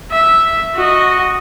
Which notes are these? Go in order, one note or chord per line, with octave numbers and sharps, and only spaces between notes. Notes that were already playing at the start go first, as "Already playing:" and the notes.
E5
F#4 D#5